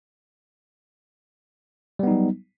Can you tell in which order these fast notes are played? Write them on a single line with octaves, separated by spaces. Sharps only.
G3 B3 D#4 F#3